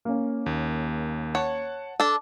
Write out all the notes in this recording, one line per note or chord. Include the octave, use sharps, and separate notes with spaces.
A#3 C#4
D#2
C#5 F#5 A5
D4 A4